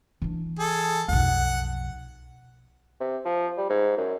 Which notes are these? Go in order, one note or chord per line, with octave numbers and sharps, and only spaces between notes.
E3 D4
G#4 A4
B1 F2 F#5
C3
F3
G3
G#2
F#2